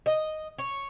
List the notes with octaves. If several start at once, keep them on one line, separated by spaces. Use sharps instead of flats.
D#5
C#5